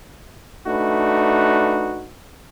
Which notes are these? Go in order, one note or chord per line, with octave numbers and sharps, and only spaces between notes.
A3 D4 D#4 F#4 B4